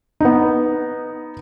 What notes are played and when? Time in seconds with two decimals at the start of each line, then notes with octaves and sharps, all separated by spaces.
0.21 B3 D#4